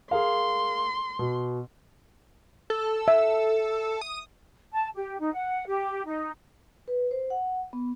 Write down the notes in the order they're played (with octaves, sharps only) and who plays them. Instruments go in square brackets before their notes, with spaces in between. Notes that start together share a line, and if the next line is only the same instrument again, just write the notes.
[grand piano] G#4 A#4 F5 [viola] C6
[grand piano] B2
[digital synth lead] A4
[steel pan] E5
[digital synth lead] D#6
[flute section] A5
G4
D#4
F#5
G4
D#4
[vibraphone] B4
C5
F#5
B3